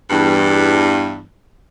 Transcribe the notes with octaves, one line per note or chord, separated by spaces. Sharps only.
E2 G2